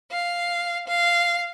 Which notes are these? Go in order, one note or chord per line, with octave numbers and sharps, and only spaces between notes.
F5
F5